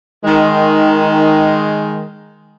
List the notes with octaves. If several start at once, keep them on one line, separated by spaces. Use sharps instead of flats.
D#3 G#3